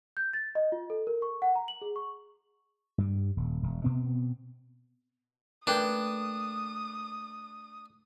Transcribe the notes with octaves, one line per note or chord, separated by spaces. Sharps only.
G6
A6
D#5
F4
A4
A#4
C#6
F#5
A#5
F#7
G#4
C#6
G2 G3
D#1
E1
B2 B3 C4
A3 A#3 D4 B4 G5 D#6